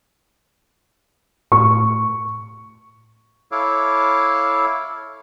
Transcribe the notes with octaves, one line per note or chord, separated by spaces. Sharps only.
A2 C#6
E4 A4 C#5 F5 D6